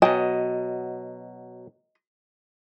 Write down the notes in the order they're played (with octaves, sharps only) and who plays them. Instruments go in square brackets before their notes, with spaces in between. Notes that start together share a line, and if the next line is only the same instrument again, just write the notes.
[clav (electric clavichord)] B2 F#3 [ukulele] D#5 [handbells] G5 G#5